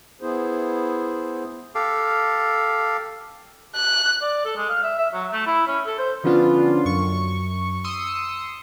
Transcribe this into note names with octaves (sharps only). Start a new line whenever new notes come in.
B3 E4 G#4 C5
G4 A4 F5
F#6
D5
A4
G#3
F5
E5
E5
F#3
A3
E4
C#4
A4
C5
D3 F3 B3 C#4 D4 F4
F#2 C#6
C6 D#6 E6 C#7